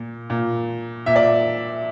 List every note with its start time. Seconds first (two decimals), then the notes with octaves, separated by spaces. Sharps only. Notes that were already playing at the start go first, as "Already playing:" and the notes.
Already playing: A#2
0.30 A#2
1.06 A#2 E5
1.16 D5